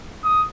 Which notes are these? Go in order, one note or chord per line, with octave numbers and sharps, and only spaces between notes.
D#6